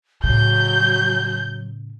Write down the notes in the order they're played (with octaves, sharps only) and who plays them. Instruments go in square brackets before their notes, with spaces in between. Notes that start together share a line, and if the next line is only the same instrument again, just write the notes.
[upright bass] A2 C#3 [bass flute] F#3 [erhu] G6